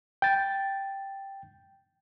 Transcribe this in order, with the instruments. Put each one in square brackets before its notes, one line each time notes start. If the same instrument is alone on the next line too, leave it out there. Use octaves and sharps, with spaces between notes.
[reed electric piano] G5 A6